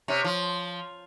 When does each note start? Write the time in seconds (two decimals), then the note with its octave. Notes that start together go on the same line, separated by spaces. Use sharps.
0.08 C3 C#4
0.24 F3